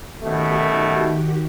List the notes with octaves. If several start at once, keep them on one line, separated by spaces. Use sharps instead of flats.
F#2 B2 D#3 A3 F#4 G4